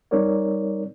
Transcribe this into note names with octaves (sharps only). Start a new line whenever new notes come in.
G3 C4 D#4 A#4 C#5 D5